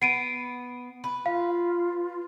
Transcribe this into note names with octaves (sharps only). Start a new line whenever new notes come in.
B3 C7 D7 D#7
B4
F4 F5